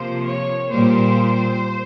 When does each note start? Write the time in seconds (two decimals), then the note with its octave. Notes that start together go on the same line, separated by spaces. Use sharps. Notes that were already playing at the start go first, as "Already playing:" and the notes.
Already playing: C3 F3 A#3 C5
0.23 C#5
0.70 A#2 G3 A#3 C5